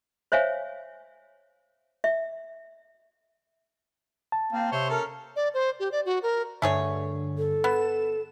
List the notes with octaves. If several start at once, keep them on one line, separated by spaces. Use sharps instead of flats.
C5 C#5 E5 F5 G#5
E5
A5
A#3 C4 F4
C3 C5 C#5
C#4 A4 A#4
D5
C5
G4
D5
F#4
A#4
G2 D3 A3 G#4 C#5
A4
B3 E7